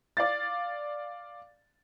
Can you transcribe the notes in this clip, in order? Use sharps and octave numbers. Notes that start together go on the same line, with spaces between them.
D5 F5 A6